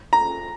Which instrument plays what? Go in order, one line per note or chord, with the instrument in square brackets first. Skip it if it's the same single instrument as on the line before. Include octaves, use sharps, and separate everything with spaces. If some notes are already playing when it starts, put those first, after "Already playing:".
[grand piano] A#5